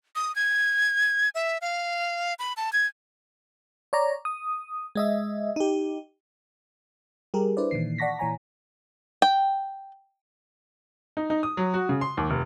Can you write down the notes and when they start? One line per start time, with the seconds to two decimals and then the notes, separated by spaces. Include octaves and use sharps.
0.16 D#6
0.36 G#6
1.35 E5
1.61 F5
2.39 B5
2.57 A5
2.73 G#6
3.93 C#5 D5 A#5
4.25 D#6
4.95 G#3 D#5 E5
5.56 D#4 G4
7.34 G3 G4 G#4 A#4
7.57 D4 E4 B4 C5 D5
7.71 A#2 D#3 E3 C7
7.98 D5 F#5 A5 C#6 A#6 B6
8.19 A#2 E3 C#5 G#5 A#5
9.22 G5
11.17 D#4
11.30 D#4
11.43 D#6
11.57 F#3
11.74 F#4
11.89 C#3
12.01 C6
12.17 D#2
12.30 F1